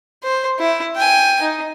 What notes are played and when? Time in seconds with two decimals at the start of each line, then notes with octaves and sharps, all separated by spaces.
0.23 C5
0.59 E4
0.96 G5 G#5
1.42 D#4